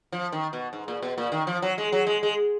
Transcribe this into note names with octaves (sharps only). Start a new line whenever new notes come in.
F3
D#3
B2
G#2
A#2
B2
A#2
D#3
F3
F#3
G#3
F#3
G#3
G#3